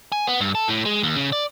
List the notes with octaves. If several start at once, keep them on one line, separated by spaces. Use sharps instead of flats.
G#5
B3
G2
A4
A2
G#3
D#2
C#3
D5